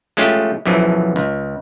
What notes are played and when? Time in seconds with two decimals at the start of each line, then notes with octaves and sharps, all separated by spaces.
0.17 G#3 A3 C#4 F4 G4
0.65 B1 F#2 E3 F3
1.16 C#2